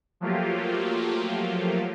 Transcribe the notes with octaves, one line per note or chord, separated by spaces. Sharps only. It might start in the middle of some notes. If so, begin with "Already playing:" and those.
F3 F#3 A3 A#3 F4 G4